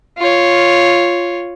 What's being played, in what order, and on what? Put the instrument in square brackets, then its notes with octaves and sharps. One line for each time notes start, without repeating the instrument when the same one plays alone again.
[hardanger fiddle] F4 C#5